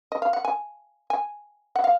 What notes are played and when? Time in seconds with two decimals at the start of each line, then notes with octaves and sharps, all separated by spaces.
0.12 D#5
0.22 F5
0.33 F#5
0.45 G#5
1.10 G#5
1.76 F#5
1.84 F5